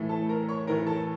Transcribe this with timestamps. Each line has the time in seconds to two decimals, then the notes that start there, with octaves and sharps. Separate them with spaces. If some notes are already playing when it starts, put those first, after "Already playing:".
Already playing: A2 E3 A3
0.09 A4 A5
0.29 A#4 A#5
0.49 C#5 C#6
0.67 A2 E3 A3 A#4 A#5
0.87 A4 A5